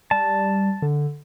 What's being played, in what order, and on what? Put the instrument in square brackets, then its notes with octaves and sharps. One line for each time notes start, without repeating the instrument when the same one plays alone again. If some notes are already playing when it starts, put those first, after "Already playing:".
[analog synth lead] G3 [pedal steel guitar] A5
[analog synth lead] D3